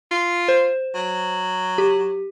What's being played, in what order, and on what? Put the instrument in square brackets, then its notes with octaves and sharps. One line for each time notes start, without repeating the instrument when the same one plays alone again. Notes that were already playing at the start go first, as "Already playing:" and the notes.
[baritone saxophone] F4
[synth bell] C5
[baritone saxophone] F#3
[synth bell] G4